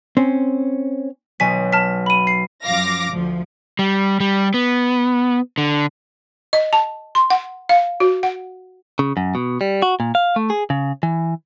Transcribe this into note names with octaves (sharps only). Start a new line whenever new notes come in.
C4 C#4
B1 B2 F#3 G#5 B6
A5 F6 B6
B5 D#7
C7
F#2 F3 F5 D6 A#6
D2 F3
G3
G3
B3
D3
D#5
A5
C6
F#5
F5
F#4
F#5
C#3
F#2
B2
G3
F#4
A#2
F5
A3
G#4
C#3
E3